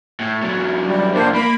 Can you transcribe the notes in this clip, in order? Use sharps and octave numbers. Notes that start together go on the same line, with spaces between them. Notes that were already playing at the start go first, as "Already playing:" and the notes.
A2
E2 F#3
G3
F2 A2 A#3 D4 C5
A#3 B5